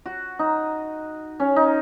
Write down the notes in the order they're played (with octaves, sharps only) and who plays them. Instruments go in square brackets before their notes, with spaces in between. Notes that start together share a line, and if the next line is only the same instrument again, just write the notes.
[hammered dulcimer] F#4
D#4
C#4
D#4